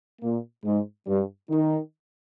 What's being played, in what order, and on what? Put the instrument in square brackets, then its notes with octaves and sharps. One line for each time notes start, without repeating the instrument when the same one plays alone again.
[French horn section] A#2 A#3
G#2 G#3
G2 G3
D#3 D#4